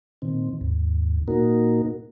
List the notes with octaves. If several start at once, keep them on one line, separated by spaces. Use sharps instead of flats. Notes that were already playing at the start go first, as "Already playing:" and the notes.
A#2 D#3 C4
D#2 G#2
A#2 A#3 D#4 F#4 A#4